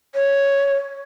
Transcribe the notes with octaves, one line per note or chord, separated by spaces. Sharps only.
C#5